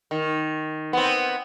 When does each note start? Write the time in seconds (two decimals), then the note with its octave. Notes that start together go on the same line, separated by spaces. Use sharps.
0.11 D#3
0.93 B3 C4